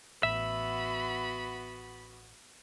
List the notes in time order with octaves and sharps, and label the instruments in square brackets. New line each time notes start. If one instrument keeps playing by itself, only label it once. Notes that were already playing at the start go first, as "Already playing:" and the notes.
[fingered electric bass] A1 [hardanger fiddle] B3 F#4 [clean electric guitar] E5 [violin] B5